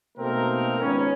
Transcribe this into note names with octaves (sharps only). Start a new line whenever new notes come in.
B2 A3 A#3 C4 D#4 A#4
G#1 C#2 G#2 B3 C#4